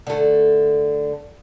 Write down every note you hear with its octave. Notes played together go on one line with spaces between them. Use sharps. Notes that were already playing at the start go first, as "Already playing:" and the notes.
D3 A3